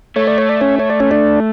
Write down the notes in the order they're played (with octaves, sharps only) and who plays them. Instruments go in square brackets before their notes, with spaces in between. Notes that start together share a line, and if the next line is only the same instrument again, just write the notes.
[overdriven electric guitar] A3 [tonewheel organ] C#5
[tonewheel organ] D5
C#5
D5
C#4 C#5
C#5
D5
C#4 C#5
D4 D5